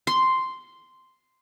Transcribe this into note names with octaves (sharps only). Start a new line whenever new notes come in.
C6